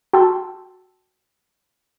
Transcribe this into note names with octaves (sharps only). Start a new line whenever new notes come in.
F#4 G5 A5 C6 E6